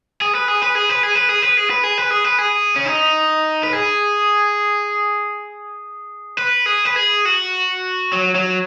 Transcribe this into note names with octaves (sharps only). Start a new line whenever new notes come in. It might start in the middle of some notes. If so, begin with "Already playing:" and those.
G#4
B4
G#4
B4
G#4
B4
G#4
B4
G#4
B4
G#4
B4
G#4
B4
G#4
B4
G#4
C#4
D#4
B4
G#4
B4
G#4
B4
G#4
F#4
F#3
F#3